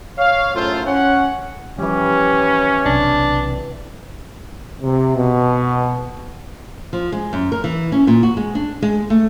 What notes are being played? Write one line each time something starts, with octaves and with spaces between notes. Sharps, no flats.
C#5 F5
F#2 A2 F4 A4 C5
C#4 F#5
E3 F3 G3 C#4 G4
B1 C3 D4
C3
B2
F3
G#3
F#2
A#4
E3
C#4
A#2
F#4
G#3
D4
G#3
A3